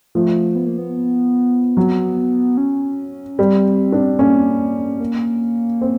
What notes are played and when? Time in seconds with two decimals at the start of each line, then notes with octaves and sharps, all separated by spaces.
0.15 F3 A3
0.56 B3
0.66 A#3
0.78 B3
1.77 F#3
2.57 C#4
3.38 G3 C4
3.92 D4
4.19 A#3 C#4
5.00 A#3
5.81 C4